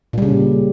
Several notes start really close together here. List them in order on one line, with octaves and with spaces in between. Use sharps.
A#2 G3 C#3